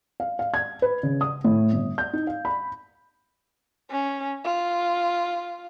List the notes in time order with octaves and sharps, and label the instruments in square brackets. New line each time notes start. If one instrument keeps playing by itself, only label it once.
[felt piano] F5
F5
G#6
B4
C#3
D#6
A2
G1
G6
D#4
F5
B5
[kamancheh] C#4
F4